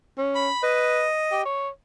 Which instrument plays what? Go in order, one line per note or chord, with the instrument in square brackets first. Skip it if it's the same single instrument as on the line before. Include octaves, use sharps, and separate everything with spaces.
[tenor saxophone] C#4
[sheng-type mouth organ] B5
[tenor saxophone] B4 [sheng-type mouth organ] D#5
[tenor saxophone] G4
C#5